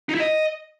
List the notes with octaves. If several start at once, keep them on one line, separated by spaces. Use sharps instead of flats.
D#4
E4
D#5